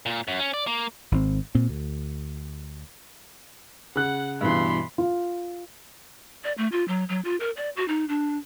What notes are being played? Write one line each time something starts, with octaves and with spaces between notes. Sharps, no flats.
A#2
F#2
C#4
D5
A#3
G#1 D3 C4
A#2 C4
D2
C#3 F#5 F#6
G2 B2 E3 B5 C6
F4
D5
A3
F4
F#3
F#3
F4
A#4
D5
F#4
D#4
D4